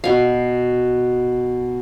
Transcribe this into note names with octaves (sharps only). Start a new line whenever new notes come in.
B2 F5